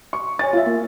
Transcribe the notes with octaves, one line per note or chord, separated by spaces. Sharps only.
C#6
C#5 G#5 A6
F4 E5
A#3